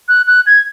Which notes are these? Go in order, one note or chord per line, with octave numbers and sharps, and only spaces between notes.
F#6
F#6
G#6